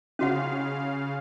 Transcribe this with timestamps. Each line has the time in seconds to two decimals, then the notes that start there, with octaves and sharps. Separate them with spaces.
0.19 C#3 C#4 F#4 F5 F#5